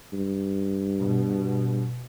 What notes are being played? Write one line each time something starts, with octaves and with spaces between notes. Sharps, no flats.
G2
B2